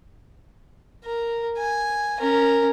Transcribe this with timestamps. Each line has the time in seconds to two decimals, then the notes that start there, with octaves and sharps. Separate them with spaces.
1.05 A#4
1.58 G#5
2.20 C#4 A#4